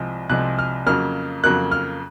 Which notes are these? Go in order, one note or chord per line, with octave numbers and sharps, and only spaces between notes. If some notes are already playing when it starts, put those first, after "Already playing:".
Already playing: C2 C3 F3 G#3
C2 C3 F3 G#3 F#6
F6
F2 C#3 F#3 A#3 F6
F2 C#3 F#3 A#3 F#6
F6